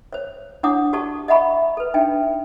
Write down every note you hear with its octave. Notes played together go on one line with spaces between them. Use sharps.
C5 C#5
D4 E4 C#5 F#5 D6 D#6
F#4 G4 A4 D5 A5 C#6
D#5 E5 F#5 A#5 B5 C#6
A4 B4
D4 D#4 E5 G5 G#5